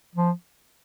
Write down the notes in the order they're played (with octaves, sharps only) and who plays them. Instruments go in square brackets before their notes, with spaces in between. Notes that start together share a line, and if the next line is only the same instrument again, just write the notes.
[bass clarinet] F3